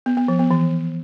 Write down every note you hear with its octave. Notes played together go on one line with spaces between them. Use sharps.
B3
B3
F3
B3
E3